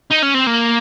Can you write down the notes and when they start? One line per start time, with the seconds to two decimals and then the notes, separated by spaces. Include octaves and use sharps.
0.11 D#4
0.22 C#4
0.34 C4
0.47 A#3